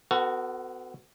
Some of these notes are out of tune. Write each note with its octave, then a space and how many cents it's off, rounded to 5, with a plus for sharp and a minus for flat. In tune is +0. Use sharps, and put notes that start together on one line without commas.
B3 +40 F#4 +0 A4 +35